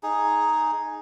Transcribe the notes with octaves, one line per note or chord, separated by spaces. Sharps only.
D#4 G#4